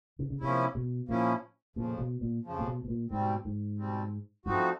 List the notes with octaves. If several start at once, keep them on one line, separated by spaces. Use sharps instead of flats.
C#3
C#3
C3 F3 A#3 C#4 E4
B2
A#2 F3 A#3 C#4 E4
F2 A#2 C#3 F3
B2
A#2
F2 C#3 F3
A#2
B2
B2
A#2
G#2 B2 G3 C4
G#2
B2 G3 C4
G2 F3 A3 C4 D#4 F#4